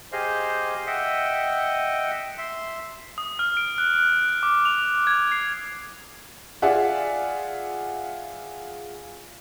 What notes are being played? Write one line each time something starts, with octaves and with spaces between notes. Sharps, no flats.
G4 G#4 C5 D#5 F5
D#5 E5 F#5 G5
E5 C6
D#6
F6
D7
F#6
F#6
D6
F7
G#6
C7
F4 G#4 D5 E5 F#5